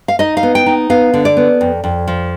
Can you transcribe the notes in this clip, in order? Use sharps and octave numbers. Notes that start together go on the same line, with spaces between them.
F5
D#4 D#5
F5
B3
G5
D#4
B3 F5
D3
D5
B3
F2
F2
F3